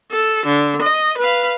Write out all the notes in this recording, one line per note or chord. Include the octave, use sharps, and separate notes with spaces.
A4
D3
D#5
B4 F5